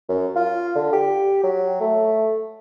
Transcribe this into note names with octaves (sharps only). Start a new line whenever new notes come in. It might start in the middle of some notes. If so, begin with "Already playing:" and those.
F#2
F4
D3
G4
F#3
A3